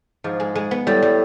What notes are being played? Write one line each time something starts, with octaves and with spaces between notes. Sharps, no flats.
G#2 F3
G#3
G#3
B3
A2 G3
G3